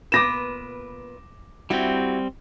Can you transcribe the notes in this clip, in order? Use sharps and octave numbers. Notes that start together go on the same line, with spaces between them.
A#2 B3 B4 D6 A#6 E7
G3 C4 E4 F#4 G4